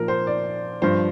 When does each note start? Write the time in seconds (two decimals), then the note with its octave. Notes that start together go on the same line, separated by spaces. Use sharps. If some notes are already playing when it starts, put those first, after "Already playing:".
Already playing: A#2 F3 A#4
0.08 C5
0.27 D5
0.82 G2 F3 C5